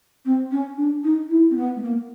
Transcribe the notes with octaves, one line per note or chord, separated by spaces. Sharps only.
C4
C#4
D4
D#4
E4
C4
B3
A3
A#3